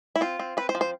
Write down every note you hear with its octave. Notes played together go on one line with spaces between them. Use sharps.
E4
C4 F4
C4
C4 B4
C5
F3
C5